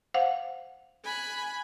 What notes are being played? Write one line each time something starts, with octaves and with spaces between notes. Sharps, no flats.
C5 F5 F#5
G#5 B5 F#6